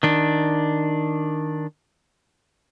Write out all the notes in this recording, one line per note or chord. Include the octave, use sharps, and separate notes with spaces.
D#3 D4